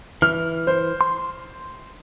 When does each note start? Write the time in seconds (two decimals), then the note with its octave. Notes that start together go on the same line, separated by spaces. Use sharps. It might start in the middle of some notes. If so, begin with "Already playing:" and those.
0.22 E3 F6
0.67 C5
1.01 C6